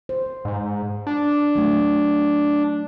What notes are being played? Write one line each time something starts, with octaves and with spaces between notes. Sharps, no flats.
C5
G#2
D4
F#3 A3